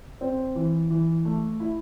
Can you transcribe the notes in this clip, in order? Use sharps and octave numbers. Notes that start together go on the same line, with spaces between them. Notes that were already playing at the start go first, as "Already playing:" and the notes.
C4
E3
E3
A3
E4